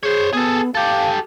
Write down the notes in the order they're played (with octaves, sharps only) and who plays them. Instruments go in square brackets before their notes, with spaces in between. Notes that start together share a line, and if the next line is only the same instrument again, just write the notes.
[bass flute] G#4 [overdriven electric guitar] C5 C#5
[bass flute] B3 [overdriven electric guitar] G#4 A4
[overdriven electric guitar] G4 A4 [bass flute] F5